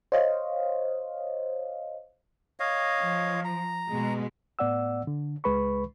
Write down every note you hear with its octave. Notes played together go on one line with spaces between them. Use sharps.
C5 C#5 D#5 F5
C#5 D#5 F5
F3
A#5
B2 G#3
A2 B3 D5 F#5 E6
D3
C#2 G#3 B4 B5 C#6